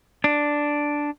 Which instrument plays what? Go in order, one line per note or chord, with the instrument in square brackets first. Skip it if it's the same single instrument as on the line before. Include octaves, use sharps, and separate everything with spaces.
[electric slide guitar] D4